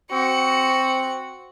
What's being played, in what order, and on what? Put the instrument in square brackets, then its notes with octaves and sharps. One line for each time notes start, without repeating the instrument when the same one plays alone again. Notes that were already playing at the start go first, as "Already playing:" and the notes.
[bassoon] C4 [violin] F#4 C#7